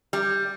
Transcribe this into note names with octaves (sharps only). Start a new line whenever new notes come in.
G3